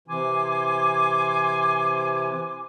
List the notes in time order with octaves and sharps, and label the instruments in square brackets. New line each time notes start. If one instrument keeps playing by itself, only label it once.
[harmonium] C3 E3 [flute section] G#5 C6 D6